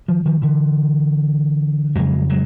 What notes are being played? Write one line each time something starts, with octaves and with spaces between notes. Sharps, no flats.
D#3 F3
D#3 F3
D3 E3
F2 C#3 F#3 G#3
F#3 G#3